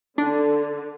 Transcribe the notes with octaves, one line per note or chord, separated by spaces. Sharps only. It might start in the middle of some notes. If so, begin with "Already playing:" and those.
D3 D4